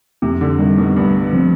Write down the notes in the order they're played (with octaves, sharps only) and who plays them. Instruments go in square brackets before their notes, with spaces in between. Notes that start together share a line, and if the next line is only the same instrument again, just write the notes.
[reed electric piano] F2 [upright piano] C3
[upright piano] D3
[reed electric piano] C3 G3 [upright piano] D#3
[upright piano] B2
[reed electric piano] C2 [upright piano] G2
[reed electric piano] C3 F3 C4